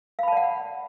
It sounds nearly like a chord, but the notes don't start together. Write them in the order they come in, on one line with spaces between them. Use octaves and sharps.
F5 B5 A5 D5 F#5